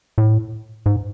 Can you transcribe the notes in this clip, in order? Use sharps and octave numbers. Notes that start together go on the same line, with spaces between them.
A2
G#2